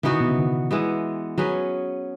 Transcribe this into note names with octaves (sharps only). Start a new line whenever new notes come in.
C#3 E3 B3 D#4 F#4
D#3
B2
C#3
D#3
E3 G#3 B3
D#3 F#3 C#4 G#4 B4